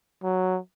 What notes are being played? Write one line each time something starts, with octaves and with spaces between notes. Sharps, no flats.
F#3